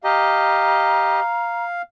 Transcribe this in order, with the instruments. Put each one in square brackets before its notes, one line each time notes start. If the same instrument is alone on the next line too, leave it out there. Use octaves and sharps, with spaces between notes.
[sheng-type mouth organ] G4 D#5 [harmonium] F5 [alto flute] A#5